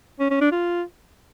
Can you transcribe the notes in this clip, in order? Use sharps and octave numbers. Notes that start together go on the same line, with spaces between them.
C#4
C#4
D4
F4